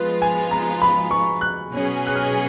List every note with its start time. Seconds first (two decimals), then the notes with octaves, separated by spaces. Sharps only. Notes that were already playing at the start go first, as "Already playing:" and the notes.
Already playing: F3 G#3 B3 F4 B4
0.22 G#5
0.51 A#5
0.82 B5
1.11 C#6
1.41 F#6
1.71 B2 F#3 C#4 G#4
2.07 F#6
2.15 F6